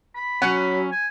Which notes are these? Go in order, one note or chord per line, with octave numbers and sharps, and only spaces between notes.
B5
F#3 C#4 F#5
G#5